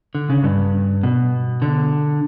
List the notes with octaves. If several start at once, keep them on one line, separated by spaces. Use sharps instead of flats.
D3
C#3
G2
B2
D3